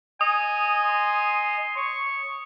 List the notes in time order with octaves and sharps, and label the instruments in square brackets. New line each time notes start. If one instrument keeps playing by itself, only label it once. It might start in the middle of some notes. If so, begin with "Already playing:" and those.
[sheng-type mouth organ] D#5 [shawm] G#5 [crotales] D#6
[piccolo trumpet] C6
[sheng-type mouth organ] C#5 [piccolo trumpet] C#6